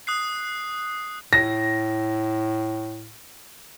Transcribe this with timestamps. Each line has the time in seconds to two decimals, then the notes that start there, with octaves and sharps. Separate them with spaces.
0.07 D#6 F#6 C7
1.33 A2 A#6